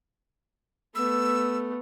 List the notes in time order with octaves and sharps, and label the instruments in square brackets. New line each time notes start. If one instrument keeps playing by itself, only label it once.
[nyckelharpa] A3 B3 [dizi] E6